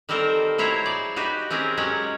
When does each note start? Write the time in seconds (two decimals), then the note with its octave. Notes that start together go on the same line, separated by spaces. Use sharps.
0.09 D#3 G3 C4 A4 A#4 C5
0.58 F#3 E4 C5 C#5 A#5
0.86 G#4 D5
1.16 D#4 F#4 G4 B4
1.51 C4 C#4 G4 G#4 A#4
1.77 F#3 G#3 C#4 C#5 F#5